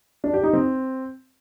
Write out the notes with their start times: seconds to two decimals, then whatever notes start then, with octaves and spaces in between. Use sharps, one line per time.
0.24 D4
0.34 G4
0.43 D#4
0.53 C4